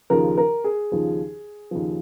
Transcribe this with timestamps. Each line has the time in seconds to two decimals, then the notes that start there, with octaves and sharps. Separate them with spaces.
0.10 D#2 C#3 F3 A#4
0.37 A#4
0.64 G#4
0.91 D#2 C#3 F3
1.71 D#2 C#3 F3